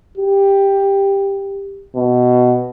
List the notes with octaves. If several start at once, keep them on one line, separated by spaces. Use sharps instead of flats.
G4
B2